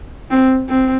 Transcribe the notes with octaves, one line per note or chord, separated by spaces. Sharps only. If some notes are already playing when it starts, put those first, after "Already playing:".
C4
C4